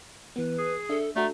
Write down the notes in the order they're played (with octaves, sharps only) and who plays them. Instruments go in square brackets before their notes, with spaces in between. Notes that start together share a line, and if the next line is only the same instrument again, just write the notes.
[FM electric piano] E3 B3 [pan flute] B4
[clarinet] G#4 [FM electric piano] D#6
[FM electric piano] D4 E5 [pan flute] A4
[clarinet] A3 [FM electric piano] D4 F#4 A4 [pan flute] A#5